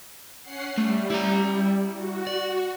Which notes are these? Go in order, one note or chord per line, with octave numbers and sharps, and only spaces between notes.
C#4 F#5 C7
G3 A3
E4 A#5
F#4
D5